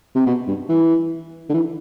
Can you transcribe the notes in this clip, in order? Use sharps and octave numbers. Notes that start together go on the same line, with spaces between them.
C3
B2
G2
E3
D3
E3